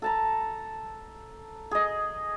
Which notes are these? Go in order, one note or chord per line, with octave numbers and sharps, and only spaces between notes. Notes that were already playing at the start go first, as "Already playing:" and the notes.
A4 A5 A#5
G#4 D#5